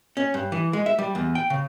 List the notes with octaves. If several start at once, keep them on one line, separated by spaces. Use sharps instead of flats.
C#4
G2
E3
G#3
E5
G3
E2
G5
C#3